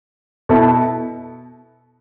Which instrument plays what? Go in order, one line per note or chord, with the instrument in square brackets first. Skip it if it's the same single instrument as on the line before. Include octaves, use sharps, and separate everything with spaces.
[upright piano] B2 B3 E4 A4